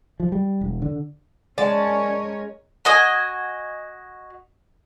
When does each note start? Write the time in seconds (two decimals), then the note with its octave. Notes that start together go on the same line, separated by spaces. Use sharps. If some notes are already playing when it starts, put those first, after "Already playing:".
0.20 F3
0.32 G3
0.61 E1
0.82 D3
1.58 G#3 C#4 A#4 C#5 D5 A5
2.85 F#4 D#5 G#5